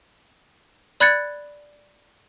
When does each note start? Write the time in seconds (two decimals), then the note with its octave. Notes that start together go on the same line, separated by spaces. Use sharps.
1.00 D5 B5 F#6 G#6 A6 C#7